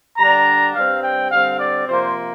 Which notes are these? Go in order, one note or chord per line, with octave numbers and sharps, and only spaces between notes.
D3 G3 D4 A#5
G2 G3 C4 F5
G5
D3 G3 C4 F5
D5
C3 F3 A#3 C5